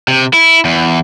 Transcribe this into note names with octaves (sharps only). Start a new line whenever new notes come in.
C3
E4
E2